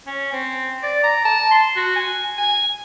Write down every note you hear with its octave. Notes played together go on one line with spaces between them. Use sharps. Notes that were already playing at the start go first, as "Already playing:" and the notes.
C#4
C4
D5
A#5
A5
C6
F#4
G#5
G#5